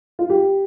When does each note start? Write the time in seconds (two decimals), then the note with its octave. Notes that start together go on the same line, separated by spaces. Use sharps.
0.19 F4
0.30 G4